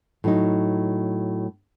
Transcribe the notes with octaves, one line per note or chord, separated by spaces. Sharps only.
A2 F#3 D#4